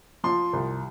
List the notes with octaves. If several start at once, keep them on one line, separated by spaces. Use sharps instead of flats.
F3 C6
C2